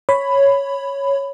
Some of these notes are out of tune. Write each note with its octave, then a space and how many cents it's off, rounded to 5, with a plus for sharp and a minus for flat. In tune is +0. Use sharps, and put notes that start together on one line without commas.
C#5 +0 B5 +10